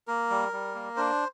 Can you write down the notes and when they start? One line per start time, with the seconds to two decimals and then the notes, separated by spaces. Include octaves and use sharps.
0.07 A#3 A#4
0.30 G3
0.53 G3
0.75 A#3
0.97 D4 C5